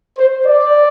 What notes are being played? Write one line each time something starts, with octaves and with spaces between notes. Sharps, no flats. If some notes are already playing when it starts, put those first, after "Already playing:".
C5
D5